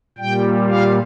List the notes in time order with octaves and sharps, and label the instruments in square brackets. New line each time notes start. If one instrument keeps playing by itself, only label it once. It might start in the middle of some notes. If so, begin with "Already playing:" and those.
[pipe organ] A#2 G3 G5
F5